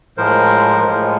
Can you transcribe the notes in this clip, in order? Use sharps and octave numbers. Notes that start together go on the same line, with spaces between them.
A2 F3 G#3 A#4 C5
A2 F3 G#3